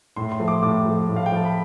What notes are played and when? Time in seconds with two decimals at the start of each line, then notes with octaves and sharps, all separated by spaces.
0.16 A2 C6
0.32 C6
0.40 F3 A3
0.48 D6
0.62 A2 D6
0.86 F3 A3
1.09 A2
1.16 F5
1.26 G5
1.32 F3 A3 A5
1.45 B5